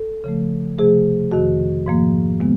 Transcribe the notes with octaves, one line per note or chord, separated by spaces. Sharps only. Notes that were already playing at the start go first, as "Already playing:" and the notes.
Already playing: A4
C#3 F3 A3
C3 F3 A3 G#4
F2 C3 D#3 F#4
G#2 F3 A#3
C3 D#3 G#3 B3